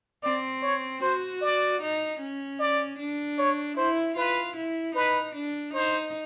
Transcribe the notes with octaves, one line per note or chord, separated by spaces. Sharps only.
C4 D5
C#5
F#4 C5
D5
D#4
C#4
D5
D4
C#5
E4 C5
F4 B4
E4
D#4 B4
D4
D#4 C5